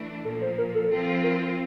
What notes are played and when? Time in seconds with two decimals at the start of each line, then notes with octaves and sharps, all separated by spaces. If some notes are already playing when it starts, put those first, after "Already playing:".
Already playing: E3 A3 D4
0.25 A#2 F3 A#3 A4
0.42 C5
0.58 A#4
0.75 A4
0.91 F3 C4 F4 A4
1.24 A#4